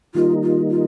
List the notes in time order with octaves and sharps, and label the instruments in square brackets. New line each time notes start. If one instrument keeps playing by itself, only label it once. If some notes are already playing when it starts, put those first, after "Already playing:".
[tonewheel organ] D#3 G3 A#3 D#4 [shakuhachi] F4
[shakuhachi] F4
F4